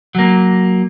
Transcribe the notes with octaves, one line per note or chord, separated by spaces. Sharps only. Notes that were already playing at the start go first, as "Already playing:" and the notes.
F#3 A#3